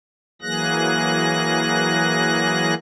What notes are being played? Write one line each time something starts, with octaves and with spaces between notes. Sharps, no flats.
E3 F#3 A#3 G#4 F#6 A#6